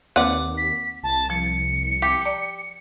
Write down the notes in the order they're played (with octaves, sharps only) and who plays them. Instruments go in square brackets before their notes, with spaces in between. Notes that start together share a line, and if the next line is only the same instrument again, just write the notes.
[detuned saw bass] D#2 [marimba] A#3 C4 B4 [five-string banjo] D5 F#5
[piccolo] B6
[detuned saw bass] C2 [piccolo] A5
[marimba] F3 [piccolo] C#7
[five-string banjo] G4
[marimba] D5 D6